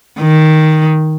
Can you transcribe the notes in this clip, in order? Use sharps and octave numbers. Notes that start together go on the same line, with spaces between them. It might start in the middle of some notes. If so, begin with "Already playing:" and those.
D#3